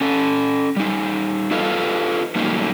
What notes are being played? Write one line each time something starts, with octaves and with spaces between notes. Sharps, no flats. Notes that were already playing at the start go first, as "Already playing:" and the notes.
C#4 A4
G3 D#4
F4 A4 B4 D#5 F5
F#3 G3 A3 A#3 D#4